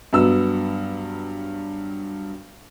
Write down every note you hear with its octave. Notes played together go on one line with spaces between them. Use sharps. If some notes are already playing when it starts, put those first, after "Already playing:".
G2 F#3 B3 E6